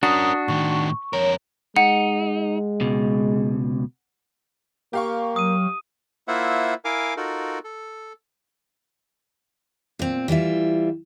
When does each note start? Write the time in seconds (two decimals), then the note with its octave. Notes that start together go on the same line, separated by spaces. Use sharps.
0.03 C#4 D4 F#4 A#4 D#6
0.48 A2 D#3 C#6
1.13 F2 A#4 C#5
1.76 G#3 D#4 F#5
2.81 C#2 B2
4.93 A#3 G4 F5 C#6
5.36 F#3 D#6 D#7
6.28 A#3 E4 F4 C5 E5 F#5
6.85 E4 A#4 F5 G#5 D6
7.17 D#4 F4 F#4 A4 A#4
7.64 A4
9.99 A#2 C4
10.28 E3 G3 F4 E5